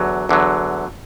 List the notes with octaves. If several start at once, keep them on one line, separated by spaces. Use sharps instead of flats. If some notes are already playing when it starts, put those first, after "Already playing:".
Already playing: E2 D3 F#3
E2 D3 F#3